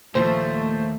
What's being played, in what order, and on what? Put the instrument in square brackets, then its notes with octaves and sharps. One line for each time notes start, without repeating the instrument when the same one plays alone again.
[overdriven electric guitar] D#2 [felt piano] A#2 F3 [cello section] A3 [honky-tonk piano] C5